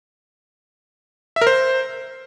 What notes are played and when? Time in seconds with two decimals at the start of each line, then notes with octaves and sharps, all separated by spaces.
1.36 E5
1.41 A#4
1.47 C5